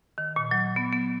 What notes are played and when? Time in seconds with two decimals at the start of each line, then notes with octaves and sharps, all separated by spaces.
0.18 D#3
0.36 A#2
0.51 F#3
0.76 B3
0.92 B3